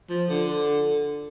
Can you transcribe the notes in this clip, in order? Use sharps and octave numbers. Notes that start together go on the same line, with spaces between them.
F3
D3